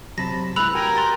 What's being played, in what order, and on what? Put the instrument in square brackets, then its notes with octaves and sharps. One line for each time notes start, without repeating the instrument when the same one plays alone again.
[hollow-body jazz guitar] F#2 C3 F#3 [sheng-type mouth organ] A5 B5 [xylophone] A#6
[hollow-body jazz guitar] G#3 E4 [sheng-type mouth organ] B4 [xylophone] B5 E6 F7 [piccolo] F#6
[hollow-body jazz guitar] F#4 G4 [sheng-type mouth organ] A#4 G5 G#5 [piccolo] A#5
[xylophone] C6 A6